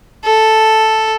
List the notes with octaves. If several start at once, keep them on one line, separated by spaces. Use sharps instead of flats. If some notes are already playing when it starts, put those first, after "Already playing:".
A4